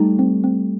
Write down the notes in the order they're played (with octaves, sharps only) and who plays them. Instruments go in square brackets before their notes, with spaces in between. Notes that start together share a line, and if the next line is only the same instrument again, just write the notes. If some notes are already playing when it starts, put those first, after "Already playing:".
Already playing: [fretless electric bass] G3 A3 [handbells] D#4
[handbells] C4
C4